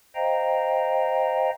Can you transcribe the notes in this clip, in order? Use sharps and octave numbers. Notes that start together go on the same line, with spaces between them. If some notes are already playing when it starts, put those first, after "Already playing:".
C5 D#5 F5 G5 A#5